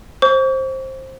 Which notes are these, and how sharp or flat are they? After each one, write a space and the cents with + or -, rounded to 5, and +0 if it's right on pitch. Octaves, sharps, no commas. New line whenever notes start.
C5 +15 C#6 +45